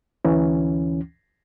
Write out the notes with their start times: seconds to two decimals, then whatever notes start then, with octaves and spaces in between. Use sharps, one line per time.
0.25 D2 E3 C#4